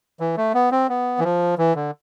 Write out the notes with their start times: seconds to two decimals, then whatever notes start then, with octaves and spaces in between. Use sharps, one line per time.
0.20 E3
0.37 A3
0.54 B3
0.72 C4
0.89 B3
1.19 E3
1.24 F3
1.58 E3
1.75 D3